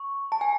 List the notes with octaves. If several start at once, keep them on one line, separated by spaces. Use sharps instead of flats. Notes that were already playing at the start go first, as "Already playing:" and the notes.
Already playing: C#6
A5
G#5